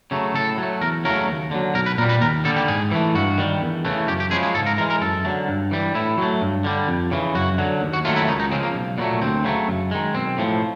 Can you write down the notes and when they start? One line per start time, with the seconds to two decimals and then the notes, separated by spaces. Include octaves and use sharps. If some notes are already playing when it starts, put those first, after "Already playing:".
0.11 C#3 F#3 A3
0.35 A2 A4
0.58 F#3 A3
0.81 E2 A#4
1.04 C#3 F#3 A3 A#4
1.28 D#2
1.51 D3 F#3
1.74 B1 A#4
1.86 B4
1.98 A#2 A#4
2.02 G3
2.09 B4
2.21 D#2 A#4
2.45 D3 G3 A4
2.57 G4
2.68 G#2 G#4
2.91 E3 A3
3.15 G2 F#4
3.38 D#3 G3
3.61 E2
3.85 C#3 E3 A3
4.08 F#2 G4
4.20 G4
4.31 C#3 F3 G#3 G#4
4.43 G#4
4.54 G#2 A4
4.66 A#4
4.78 E3 A#4
4.81 G#3
4.90 A#4
5.01 F#2 A4
5.25 D3 F#3 A3
5.48 G2
5.71 E3 G3
5.95 A2 E4
6.18 F#3 A3
6.41 G2
6.64 D3 G3
6.88 F2
7.11 C#3 E3
7.35 F#2 F#4
7.58 D3 F#3
7.82 D#2
7.93 F#4
8.05 D#3 F#3 A3 F4
8.16 E4
8.28 C#2 D#4
8.40 D#4
8.51 C#3 F3 G#3 C4
8.63 A#3
8.75 B1
8.98 A#2 F#3 A3 B3
9.21 D2 C4
9.45 C#3 F#3 A3
9.68 F#2
9.91 D#3 G#3
10.14 B1 C4
10.38 A2 F3